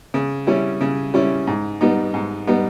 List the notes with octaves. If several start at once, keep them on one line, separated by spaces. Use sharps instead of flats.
C#3
G3 C#4 E4
C#3
G3 C#4 E4
G#2
G3 B3 D#4
G#2
G3 B3 D#4